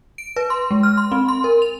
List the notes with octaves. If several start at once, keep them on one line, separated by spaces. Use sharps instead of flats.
D7
B4
C6
G#3
F6
C6
C4
C6
A#4
F7